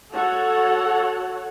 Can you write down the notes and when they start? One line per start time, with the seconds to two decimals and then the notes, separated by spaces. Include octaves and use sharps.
0.12 F#4 A4 C#5 F#5